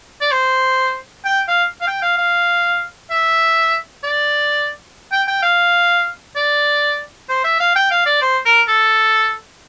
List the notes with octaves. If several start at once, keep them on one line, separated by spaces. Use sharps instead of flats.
D5
C5
G5
F5
F5
G5
F5
F5
E5
D5
G5
G5
F5
D5
C5
E5
F5
G5
F5
D5
C5
A#4
A4